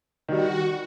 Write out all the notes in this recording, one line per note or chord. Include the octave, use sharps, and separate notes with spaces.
D#3 G3 F#4